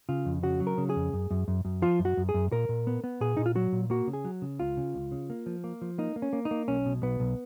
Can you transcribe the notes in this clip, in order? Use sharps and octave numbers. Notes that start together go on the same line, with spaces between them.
C#3 F4
F2
C#3 F#4
F#3
A#4
C#3
G#4
F2
F#2
F#2
F#2
F#2
F3 F4
F#2
F#4
F#2
G#4
F#2
A#2 A#4
A#2
B3
B3
A#2 G#4
A#2 D#4
F4
F#3 F#4
A#2
A#3 F#4
C#3
G#4
F#3
C#3
C#2 F4
C#3
C#2
C#3
A#3
F3
A#3
F3
A#3 D#4
A#3
C#4
A#3
D#4
A#3
B1 C#4
B2
B1 B3
B1